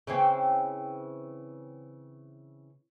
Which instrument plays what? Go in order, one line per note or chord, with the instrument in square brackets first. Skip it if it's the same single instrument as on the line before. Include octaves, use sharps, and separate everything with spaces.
[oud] C#3 E3 C4